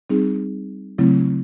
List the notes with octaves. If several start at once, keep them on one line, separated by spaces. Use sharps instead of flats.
G3 C4 D#4 G#4
C#3 F#3 A3 C4 E4